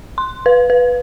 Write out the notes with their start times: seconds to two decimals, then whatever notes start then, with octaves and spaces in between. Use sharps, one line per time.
0.18 C6
0.46 B4
0.70 B4